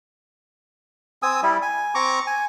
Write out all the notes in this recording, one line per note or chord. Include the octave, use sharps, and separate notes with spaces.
C4 G#5 D#6 E6
G3 E4
G#5
C4 A#5 C#6 D6
G#5